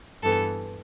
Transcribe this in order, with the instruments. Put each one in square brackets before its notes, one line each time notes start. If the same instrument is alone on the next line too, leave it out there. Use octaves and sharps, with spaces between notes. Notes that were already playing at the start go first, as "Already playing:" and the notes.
[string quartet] G2 E3 B3 A4